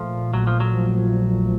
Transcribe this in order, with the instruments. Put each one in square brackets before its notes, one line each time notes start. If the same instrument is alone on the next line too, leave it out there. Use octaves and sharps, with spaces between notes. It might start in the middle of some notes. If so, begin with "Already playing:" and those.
Already playing: [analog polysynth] A#2 A3 [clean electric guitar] F3
[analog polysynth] A#1 [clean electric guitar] F#3
[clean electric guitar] F3
F#3
[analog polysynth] F3
A#2